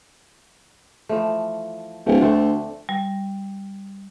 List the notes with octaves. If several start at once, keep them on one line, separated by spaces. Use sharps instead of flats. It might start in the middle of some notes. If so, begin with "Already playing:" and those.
E3 F3 A3
D1 A3
D2 A3 C4 D4
G3